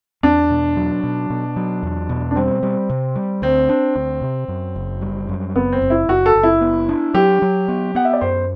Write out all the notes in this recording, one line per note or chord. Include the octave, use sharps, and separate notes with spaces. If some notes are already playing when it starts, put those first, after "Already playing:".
E2 D4
B2
F#3
B2
B2
F#3
E2
B2
D4
G3 C4
G3
C3
G3
D2 C4
D4
D2
C3
F#2
F#1
G3
F#2
F#1 B3
C4
F#1
E4
F#1 F#4
A4
F#1
E4
B3
D4
F#3 G4
F#3
B3
B3 F#5
E5
D5
F#2 C5